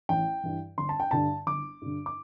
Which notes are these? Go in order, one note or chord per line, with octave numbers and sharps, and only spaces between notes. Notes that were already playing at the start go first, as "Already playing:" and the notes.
A1 G5
G2 E3
G1 C6
A5
G5
G2 D3 A5
G1 D6
G2 D3
D6